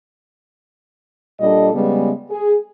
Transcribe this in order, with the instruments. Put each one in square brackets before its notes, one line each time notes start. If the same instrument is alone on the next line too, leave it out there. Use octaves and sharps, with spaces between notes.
[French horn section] A#2 G3 D4 A4 D#5
C#3 G3 G#3 B3
G#4